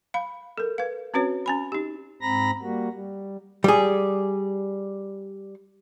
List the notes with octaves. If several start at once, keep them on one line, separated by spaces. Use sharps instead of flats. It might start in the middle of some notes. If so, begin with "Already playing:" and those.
F5 B5
A4 A#4
B4 F5
C4 C#4 F#4 B4 C#5
C#4 G#5 B5
D#4 G4
G#2 C4 A#5 B5 A#6
G3 A#3 F#4
G3
G3 G#4